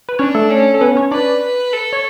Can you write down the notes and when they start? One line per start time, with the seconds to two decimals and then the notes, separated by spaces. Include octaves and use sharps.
0.09 B4
0.19 C#4 D4 C#5
0.35 A3 A4
0.50 C#4
0.74 A4
0.81 B3 B4
0.96 C#4 C#5
1.11 D4 B4 D5
1.42 B4
1.73 A4
1.93 C#5